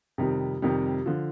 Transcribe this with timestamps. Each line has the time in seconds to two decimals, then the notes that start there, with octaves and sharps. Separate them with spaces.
0.18 F2 C3 D#3 G3
0.62 F2 C3 D#3 G3
1.06 D3 F3